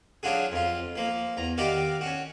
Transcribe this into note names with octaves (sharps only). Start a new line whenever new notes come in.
F#3 D4 F4 F#4 G#4
F2 F4
F3 A#3
E2 A#5
D#3 F#4 G4 D5 F5 A#5
C#4 F#4